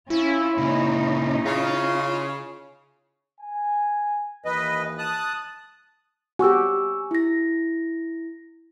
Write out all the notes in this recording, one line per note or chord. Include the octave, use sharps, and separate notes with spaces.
C#4 E4 F4
A#2 C#3 C#4 D#4
C#3 F4
G#5
D#2 E3 B4 D#5
A5 D#6 F#6
F#4 G4 G#5 C#6 E6
E4 A#6